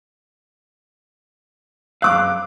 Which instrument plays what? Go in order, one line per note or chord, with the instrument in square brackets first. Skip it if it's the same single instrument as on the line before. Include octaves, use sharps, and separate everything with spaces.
[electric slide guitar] F#2 E3 F5 [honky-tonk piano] D6 F#6